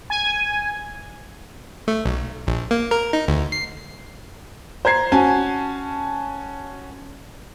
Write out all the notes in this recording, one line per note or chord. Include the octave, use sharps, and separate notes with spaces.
G#5
A3
B1
A#1
A#3
A#4
D#4
D2
C7
C5 A#5 G#6 C7
C#4 F#4 G#5 A5